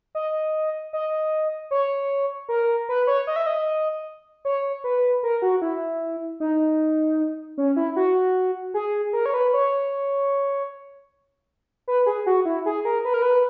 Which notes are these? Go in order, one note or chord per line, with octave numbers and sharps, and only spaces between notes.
D#5
D#5
C#5
A#4
B4
C#5
D#5
E5
D#5
C#5
B4
A#4
F#4
E4
D#4
C#4
E4
F#4
G#4
A#4
C#5
B4
C#5
B4
G#4
F#4
E4
G#4
A#4
B4
A#4
B4